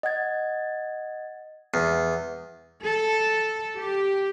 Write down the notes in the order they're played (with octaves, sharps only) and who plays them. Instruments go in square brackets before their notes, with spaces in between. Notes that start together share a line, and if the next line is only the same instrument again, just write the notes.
[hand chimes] D#5 F#5 G#6 A6
[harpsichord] E2
[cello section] A4
G4